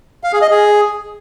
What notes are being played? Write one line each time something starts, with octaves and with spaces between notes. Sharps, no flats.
F5
G#4
D#5
G#4